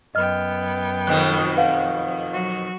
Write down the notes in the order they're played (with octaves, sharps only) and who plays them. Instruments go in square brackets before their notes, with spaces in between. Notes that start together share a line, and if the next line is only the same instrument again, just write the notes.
[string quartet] F#2 B3 G5 [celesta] D#5 F6
[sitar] F2 B2 D#3 [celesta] F#6
[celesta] B4 F5 F#5
[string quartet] F#3 F#4